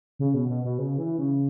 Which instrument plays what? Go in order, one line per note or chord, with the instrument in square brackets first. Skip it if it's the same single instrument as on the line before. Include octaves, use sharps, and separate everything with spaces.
[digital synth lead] C#3
B2
B2
B2
C#3
E3
C#3